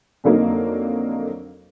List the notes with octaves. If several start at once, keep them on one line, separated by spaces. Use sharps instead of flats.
F2 D3 F#3 A#3 D#4